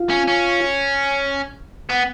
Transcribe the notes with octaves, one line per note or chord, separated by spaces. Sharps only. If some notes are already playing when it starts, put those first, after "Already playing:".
Already playing: F4
C#4
C#4
B3